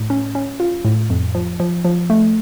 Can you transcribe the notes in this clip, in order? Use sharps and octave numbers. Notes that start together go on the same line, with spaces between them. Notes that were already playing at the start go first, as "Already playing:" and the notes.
Already playing: A2
C#4
C#4
F4
A2
F2
F3
F3
F3
A3